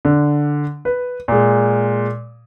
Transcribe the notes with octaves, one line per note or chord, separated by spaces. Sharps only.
D3
B4
A#2 G#3